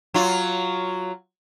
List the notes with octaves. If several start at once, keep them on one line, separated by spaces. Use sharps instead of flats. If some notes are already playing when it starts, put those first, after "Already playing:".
F#3 F4